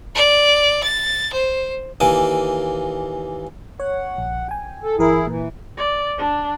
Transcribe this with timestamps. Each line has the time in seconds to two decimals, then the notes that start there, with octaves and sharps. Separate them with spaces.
0.15 D5
0.83 A6
1.33 C5
2.00 D#2 E3 A#3 G#5 D6
3.80 C#5 F#5
4.18 A#1
4.49 G5 G#5
4.83 A4
4.98 G1 E3 E4 G#4 A#4
5.27 A#2 E3
5.78 D5
6.18 D4